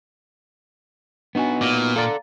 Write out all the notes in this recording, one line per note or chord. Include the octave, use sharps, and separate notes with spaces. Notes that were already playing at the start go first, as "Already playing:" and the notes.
B3 D4 D#4 F#4 G#5
A#2 D6
A4 D5 F5 A#5 A6